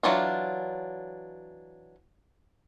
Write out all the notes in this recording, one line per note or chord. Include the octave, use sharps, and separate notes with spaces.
E3 F#3 D4 F4